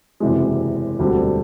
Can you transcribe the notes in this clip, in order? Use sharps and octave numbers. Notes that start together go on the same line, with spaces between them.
F#1 E2 C3 E3 G#3
E1 D2 D3 G3 C4